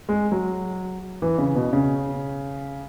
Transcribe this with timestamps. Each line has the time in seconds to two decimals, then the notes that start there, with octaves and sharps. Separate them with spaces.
0.09 G#3
0.32 F#3
1.22 E3
1.38 C#3
1.55 B2
1.73 C#3